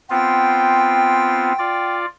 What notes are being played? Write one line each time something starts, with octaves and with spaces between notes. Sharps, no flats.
B3 C4 F4 G5
F4 D5